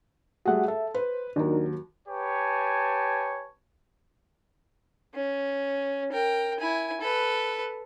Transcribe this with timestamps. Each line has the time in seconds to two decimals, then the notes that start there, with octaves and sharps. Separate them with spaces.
0.46 G3 A3 F#4 G#4 F#5
0.68 A4 E5
0.94 B4 C5
1.36 D#2 F#3 D4 D#4 A#4
2.08 G4 B4 C#5 G#5 A5
5.14 C#4
6.12 A#4 G5
6.60 E4 G#5
7.01 A4 B4